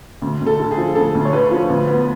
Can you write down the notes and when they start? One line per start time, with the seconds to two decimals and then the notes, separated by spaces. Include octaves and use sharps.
0.22 D2
0.41 D2
0.46 A4
0.59 D3
0.71 G#4
0.77 F3
0.95 D2 A4
1.14 D2
1.25 C#5
1.33 D3 B4
1.51 F3
1.70 D2
1.88 B3